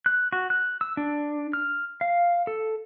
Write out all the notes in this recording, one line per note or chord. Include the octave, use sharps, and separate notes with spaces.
F#6
F#4
F#6
E6
D4
F6
F5
A4